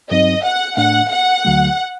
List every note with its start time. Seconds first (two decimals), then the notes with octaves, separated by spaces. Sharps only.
0.10 G2 F#3 C4 D#4 D#5
0.44 F#5
0.77 A2 A3 D4 F#5
1.10 F#5
1.45 D2 D3 F#3 A3